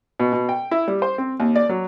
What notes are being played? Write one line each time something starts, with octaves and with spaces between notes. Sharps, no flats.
B2
B2
G5
E4
G3
C5
C4
D#2
D5
F#3